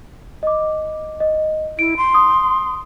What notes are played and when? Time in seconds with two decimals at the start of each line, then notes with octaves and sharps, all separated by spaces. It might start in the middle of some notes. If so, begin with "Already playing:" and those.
0.43 D#5 D6
1.20 D#5
1.79 E4 D7
1.97 C6
2.14 D#6